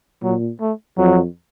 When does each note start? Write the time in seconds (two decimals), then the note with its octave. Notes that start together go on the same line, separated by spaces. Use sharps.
0.23 A#2 F#3
0.61 A3
0.97 F2 F#3